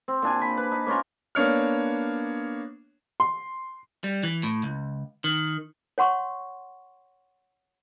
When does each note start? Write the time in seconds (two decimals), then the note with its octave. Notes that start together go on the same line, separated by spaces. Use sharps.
0.08 C4
0.22 A#2 D4 G#5
0.41 B5
0.57 B4
0.72 D#4
0.86 A#3 C#4 F4 A#4
1.35 A#3 B3 D4 C#5 F6
3.20 C6
4.04 G3
4.23 E3
4.43 A2
4.63 C#2
5.24 D#3
5.98 C#5 F#5 C6 C#6